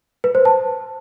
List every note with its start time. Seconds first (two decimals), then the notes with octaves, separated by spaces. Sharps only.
0.24 B4
0.35 C5
0.45 A5